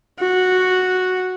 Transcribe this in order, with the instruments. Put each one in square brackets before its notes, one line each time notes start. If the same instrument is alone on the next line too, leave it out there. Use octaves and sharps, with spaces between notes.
[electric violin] F#4